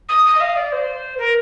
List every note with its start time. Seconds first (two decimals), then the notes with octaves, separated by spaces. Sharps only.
0.09 D#6
0.25 D#6
0.35 D#5
0.40 F5
0.56 D5
0.72 C5
1.18 A#4